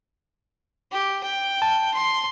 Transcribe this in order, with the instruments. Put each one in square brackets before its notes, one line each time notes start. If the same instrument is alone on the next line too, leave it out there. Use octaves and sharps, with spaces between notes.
[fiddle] G4
G5
[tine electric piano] A5
[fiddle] C6